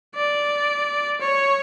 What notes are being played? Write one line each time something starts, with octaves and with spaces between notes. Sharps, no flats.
D5
C#5